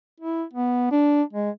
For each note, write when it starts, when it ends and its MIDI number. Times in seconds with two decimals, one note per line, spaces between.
0.20 0.43 64
0.53 0.87 59
0.91 1.23 62
1.33 1.50 56